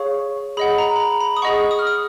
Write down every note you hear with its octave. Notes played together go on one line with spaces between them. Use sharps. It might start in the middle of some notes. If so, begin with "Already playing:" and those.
Already playing: G#4 C#5 F5 C#6
G#4 D#5 F#5 B5
A#5
B5
A#5
B5
D#6
G#4 D#5 F#5 C#6
D#6
F6
D#6